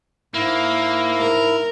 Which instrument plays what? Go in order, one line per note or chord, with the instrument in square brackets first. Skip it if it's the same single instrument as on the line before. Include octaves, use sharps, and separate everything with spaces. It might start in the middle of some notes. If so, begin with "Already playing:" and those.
[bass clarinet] G#2 [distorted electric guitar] A#3 [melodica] E4
[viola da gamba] A#4